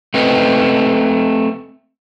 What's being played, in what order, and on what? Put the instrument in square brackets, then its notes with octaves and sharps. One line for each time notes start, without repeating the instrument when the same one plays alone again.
[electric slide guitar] A3 C4 B4 D#5